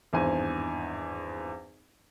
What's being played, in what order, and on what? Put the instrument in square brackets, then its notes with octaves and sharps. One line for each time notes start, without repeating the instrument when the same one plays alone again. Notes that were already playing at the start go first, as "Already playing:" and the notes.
[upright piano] G#1 E2 G2 C5 G#5